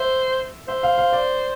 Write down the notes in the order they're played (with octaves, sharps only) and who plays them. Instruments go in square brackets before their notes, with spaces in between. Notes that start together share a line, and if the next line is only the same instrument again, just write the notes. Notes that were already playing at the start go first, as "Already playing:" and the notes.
Already playing: [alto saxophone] C5 [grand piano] E5
[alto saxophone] C5 [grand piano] E5
[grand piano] F5
F5
D5